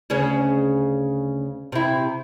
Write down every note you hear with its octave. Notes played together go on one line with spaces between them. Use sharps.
D2 C#3 C#4
C3 E4